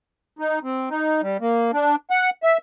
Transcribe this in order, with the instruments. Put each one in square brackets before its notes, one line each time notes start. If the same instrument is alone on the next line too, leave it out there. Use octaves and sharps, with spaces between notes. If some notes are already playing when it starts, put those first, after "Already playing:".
[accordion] D#4
C4
D#4
G3
A#3
D4
F#5
E5